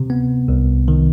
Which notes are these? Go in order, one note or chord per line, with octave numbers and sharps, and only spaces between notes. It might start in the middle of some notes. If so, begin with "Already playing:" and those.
Already playing: C3
B3
C2
D#3